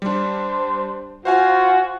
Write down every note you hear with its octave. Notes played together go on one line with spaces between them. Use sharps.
G3 D4 C5
F4 F#4 C5 F5 G#5